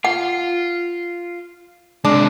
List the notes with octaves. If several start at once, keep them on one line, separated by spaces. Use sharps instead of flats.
F4 F#5
C3 G#3 D4